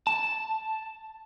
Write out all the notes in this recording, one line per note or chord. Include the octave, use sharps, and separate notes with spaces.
A5